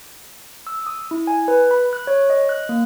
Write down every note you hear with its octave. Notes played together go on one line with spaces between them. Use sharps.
E6
D#6
E4
G#5
B4
B5
F#6
C#5
D#5
F#6
A#3